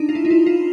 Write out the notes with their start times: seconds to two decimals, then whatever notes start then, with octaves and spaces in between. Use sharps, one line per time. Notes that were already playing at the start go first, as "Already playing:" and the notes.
Already playing: D4 D#4
0.09 F4
0.15 E4
0.25 D#4
0.31 E4
0.46 F4